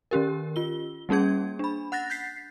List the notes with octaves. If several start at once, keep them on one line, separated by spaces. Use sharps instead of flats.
D#3 C#4 G4 A#4
F4 G7
G3 A#3 C#4 G#4 G#6
D4 B5
F#5 F#6 A6 A#6
G6 A6 B6 C7